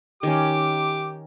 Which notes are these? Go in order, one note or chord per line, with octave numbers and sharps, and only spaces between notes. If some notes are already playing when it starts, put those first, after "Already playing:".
D#3 C#4 G4 D6